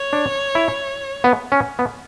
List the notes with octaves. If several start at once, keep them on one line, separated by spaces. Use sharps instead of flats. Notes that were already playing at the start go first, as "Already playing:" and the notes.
Already playing: C#5
D4
E4
B3
C#4
B3